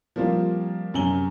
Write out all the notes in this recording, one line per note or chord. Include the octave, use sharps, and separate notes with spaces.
F3 G3 A#3 C4 F4
F#2 C3 G#5 F#7 G7